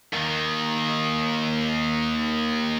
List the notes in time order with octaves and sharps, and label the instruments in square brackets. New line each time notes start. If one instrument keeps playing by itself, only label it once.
[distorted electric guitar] D#2 D#3